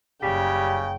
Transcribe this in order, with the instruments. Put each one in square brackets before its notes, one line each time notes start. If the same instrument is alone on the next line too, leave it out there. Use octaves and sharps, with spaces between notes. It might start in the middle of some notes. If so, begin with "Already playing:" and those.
[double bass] F#1 [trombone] C#3 [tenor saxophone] G3 [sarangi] G5